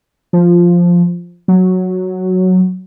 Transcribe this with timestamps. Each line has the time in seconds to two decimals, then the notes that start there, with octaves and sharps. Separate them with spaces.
0.33 F3
1.48 F#3